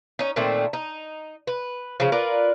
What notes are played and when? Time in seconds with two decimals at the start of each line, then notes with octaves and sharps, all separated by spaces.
0.19 C#4 D#4
0.36 A#2 D#3 A3 C4
0.73 D#4
1.47 B4
2.00 C#3 F3
2.12 F4 A#4 B4 D5